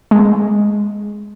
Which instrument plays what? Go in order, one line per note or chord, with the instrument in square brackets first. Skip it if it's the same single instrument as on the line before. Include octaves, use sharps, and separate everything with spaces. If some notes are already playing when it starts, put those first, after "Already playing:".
[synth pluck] G#3